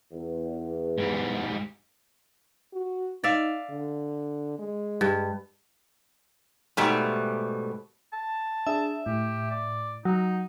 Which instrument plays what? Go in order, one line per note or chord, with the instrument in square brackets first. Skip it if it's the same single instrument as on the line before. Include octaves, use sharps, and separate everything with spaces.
[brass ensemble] E2
[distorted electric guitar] G#2 G3
[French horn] F#4
[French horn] D#4 [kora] D5 E5 F5
[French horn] D3
G#3
[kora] G2
[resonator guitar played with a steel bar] G#2 B2 G3 A3
[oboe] A5
[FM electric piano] D4 G#4 [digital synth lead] E5
[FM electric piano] A2 [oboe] G4
[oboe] D5
[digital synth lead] F#3 [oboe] D#4